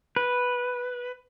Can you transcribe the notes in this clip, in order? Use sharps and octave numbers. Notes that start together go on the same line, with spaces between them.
B4